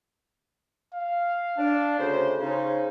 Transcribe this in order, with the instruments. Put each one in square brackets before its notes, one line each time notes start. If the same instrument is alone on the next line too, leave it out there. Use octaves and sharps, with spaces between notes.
[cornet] F5
[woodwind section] D4
D2 C#3 C5
[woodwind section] C#3 D#4 [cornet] C5